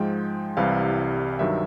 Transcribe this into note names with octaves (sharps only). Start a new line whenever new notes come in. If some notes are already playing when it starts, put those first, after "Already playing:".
Already playing: G#2 F3 G#3 G5
C2 C3 E3 G3 F5
G2 D#3 F#3 E5